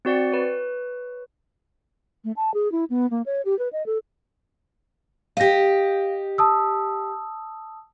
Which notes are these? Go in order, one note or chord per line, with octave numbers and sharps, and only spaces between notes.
C4 F#4 D5 A6 C#7
B4 C#5
A3
A5
G#4
E4
B3
A#3
C#5
G4
B4
D#5
A4
G4 D#5 F5 A#6
A5 D#6 E6